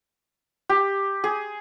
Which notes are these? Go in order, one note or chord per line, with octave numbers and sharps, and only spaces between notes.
G4
G#4